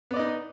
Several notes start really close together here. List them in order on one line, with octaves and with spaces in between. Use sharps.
B3 D5 D#5 D#4